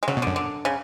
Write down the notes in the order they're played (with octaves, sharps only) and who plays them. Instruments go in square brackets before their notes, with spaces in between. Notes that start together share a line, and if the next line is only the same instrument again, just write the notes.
[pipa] G#3
[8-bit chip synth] C#3 [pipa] F#3
[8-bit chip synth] B2
[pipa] D3
[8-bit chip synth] F#2
[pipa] D3
C#3